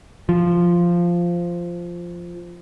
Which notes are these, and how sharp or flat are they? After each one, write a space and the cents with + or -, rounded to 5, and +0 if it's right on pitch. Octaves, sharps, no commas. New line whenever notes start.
F3 -5